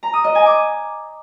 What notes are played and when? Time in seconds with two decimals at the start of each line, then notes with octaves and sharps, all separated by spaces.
0.03 A#5
0.13 D#6
0.24 D#5
0.35 G#5
0.46 D6